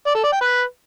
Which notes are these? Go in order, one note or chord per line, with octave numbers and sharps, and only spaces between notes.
D5
A4
D5
G5
B4